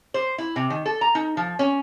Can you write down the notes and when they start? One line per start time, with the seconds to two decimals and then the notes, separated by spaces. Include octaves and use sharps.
0.14 C5
0.38 E4
0.56 C3
0.70 D#3
0.86 A4
1.01 A#5
1.15 D#4
1.37 F3
1.59 C#4